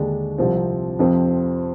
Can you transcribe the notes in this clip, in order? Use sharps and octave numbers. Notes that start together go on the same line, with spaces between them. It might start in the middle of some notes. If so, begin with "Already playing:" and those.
Already playing: D#2 D3 G#3 D4
C2 C3 F3 C4
F2 C3 F3 C4